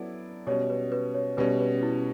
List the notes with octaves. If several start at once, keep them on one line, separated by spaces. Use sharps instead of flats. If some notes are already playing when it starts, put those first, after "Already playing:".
Already playing: F#3 B3 E4 A4 D5
B2 G3 C#4 C#5
B4
B4
C#5
B2 G3 C#4 B4
B4
E4